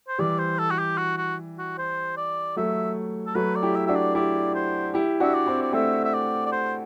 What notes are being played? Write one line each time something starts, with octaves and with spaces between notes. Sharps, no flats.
C5
E3 G3 D5
C5
A4
F#4
G4
F#4
F#4
F#4
C5
D5
F#3 A3 E5
A4
F#3 A3 B4
D5
E4 G4
E5
D4 F#4 E5
D5
E4 G4 D5
C5
E4 G4
D4 F#4 E5
D5
C4 E4
D5
A3 C4 E5
E5
D5
D5
C5